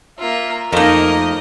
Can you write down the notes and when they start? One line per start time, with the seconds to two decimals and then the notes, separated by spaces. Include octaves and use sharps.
0.19 A#3 F4 E5
0.73 F2 A3 A#3 D#4 A#4 D#5